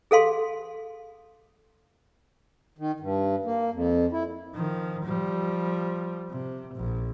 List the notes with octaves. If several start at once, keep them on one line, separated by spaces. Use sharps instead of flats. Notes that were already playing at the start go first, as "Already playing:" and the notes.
G#4 A4 F5 C6
D#3
G2
A#3
F2
E4
D#3 F3
F3 G3
C3
A#1